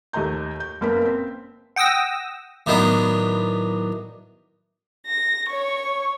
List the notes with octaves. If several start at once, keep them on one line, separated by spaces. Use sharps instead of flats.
D#2 A3 D#5 A#5 G6
G6
F#1 C#3 A#3 B3 A#4 B6
C4
F#5 G5 D#6 E6 A#6
A2 D#3 F#3 B3 D4
A#6
C#5 C#6